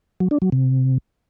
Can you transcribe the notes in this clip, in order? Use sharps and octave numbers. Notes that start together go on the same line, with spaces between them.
F#3
D4
F#3
C3